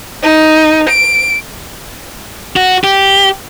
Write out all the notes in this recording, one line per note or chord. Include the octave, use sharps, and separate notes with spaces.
D#4
D7
F#4
G4